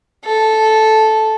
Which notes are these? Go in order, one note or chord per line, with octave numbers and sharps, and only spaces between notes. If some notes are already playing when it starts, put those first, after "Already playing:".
A4